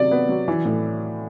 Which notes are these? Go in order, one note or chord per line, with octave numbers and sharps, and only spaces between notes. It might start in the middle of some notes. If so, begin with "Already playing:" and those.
Already playing: C3 F#3 D5
B3
F#3
E3
A2